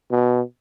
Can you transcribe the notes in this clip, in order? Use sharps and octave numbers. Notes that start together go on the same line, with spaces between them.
B2